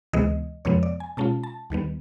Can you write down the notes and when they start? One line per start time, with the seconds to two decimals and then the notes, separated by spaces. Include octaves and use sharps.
0.13 D2 C3 E3 G#3 B3 D#5
0.65 F2 C3 F3 G#3 B3 C#5
0.83 D5
1.00 G#5
1.17 B2 G#3 C#4 F4 A5
1.43 A5
1.70 D#2 D#3 G3 B3